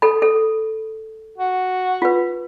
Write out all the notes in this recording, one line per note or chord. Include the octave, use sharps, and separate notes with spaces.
A4 B5
A4
F#4
F4 B4